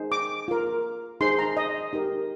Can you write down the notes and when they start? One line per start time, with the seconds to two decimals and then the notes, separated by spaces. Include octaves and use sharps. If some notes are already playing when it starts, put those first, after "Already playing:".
Already playing: D#4 G#4 C5
0.12 D6
0.48 F4 A#4
1.20 D#4 G#4 C5 C6
1.39 A#5
1.57 D#5
1.93 D#4 G4 A#4